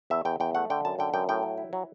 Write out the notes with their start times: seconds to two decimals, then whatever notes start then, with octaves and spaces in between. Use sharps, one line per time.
0.10 E2 E5
0.25 E2 G5
0.40 E2 G5
0.55 A3 F#5
0.70 D3 G5
0.85 F#2 A5
0.99 D3 G5
1.14 F#2 G5
1.29 A2 G5
1.43 F#3
1.58 E4
1.73 F#3